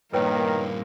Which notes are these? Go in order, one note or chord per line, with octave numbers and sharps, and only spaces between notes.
G2 A#2 D#3 A#3 A#4 B4 C#5 G5